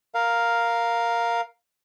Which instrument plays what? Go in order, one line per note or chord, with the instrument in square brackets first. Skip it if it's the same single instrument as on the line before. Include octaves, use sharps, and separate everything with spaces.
[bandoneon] A#4 F5